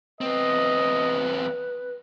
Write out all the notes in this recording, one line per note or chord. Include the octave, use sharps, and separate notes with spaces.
E2 C4 B4 D#5